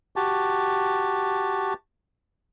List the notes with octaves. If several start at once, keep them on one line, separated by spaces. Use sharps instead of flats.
F#4 G4 A5